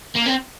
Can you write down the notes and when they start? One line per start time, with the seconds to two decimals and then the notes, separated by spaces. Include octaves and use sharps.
0.15 A#3
0.26 C4